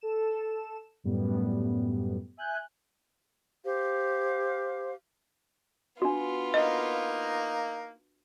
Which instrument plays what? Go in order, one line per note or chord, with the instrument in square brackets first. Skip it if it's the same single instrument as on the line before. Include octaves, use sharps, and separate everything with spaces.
[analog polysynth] A4 E7
F#2 A2 G3 B3
E5 G#5 F#6 G6
[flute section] G4 C5 F5
[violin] B3 F4 [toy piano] D4 F#4
[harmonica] A#3 D#4 [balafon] D#5